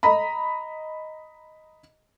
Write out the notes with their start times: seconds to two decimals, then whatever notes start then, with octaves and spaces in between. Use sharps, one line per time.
0.03 D#5 A#5 B5